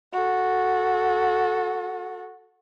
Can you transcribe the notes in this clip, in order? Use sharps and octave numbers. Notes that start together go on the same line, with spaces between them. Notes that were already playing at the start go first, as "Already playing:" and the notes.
F#4 A4